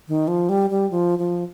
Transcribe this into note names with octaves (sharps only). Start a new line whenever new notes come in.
D#3
F3
G3
G3
F3
F3